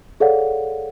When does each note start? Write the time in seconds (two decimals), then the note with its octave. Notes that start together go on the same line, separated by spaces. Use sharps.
0.20 G#4 A4 C#5 D5 F5 F#5